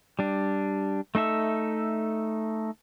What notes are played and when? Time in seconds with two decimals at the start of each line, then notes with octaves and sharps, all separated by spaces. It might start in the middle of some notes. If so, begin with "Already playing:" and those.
0.19 G3 D4
1.15 A3 D#4 A4 E5